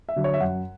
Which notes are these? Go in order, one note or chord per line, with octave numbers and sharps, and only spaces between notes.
E5
D3 F#3
C#5
E5
F#2 F#5